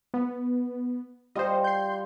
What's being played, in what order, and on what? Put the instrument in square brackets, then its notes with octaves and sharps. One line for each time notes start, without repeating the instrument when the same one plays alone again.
[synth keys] B3
[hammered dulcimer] G3 F4 [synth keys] C5 D#5
[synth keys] C6 G6